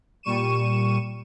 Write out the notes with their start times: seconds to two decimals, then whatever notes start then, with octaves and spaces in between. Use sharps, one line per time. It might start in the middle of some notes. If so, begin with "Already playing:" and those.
0.23 A#2 G3 C#6 D#7 E7